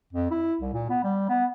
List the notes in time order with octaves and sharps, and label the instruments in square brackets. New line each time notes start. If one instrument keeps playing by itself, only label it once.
[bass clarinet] F2
E4
C2
A#2
B3
G3
B3